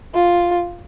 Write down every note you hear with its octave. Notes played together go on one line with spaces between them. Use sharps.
F4